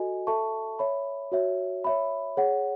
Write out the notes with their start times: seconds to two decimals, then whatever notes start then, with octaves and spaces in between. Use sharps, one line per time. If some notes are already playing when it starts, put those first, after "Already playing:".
Already playing: F#4 A4 D#5 G#5
0.27 A4 E5 A5 C#6
0.79 C#5 E5 B5
1.32 F#4 C#5 E5
1.84 C#5 E5 B5
2.37 G#4 C#5 F#5